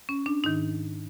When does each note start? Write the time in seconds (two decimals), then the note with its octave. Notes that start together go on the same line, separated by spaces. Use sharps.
0.09 C#4
0.26 D4
0.44 G#2 D#3 D#4